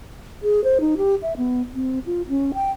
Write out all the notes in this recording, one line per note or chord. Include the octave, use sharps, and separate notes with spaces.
G#4
C5
D#4
G4
E5
B3
C4
F4
C#4
G5